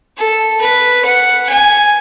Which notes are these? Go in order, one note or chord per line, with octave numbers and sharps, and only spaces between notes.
A4
B4
F#5
G#5